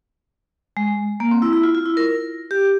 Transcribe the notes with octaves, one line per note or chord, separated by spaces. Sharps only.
G#3
A#3
C4
E4
E4
F4
F4
E4
A#4
G4